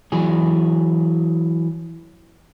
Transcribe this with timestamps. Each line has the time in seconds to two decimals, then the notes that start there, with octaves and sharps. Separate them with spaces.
0.12 E3 F#3 G#4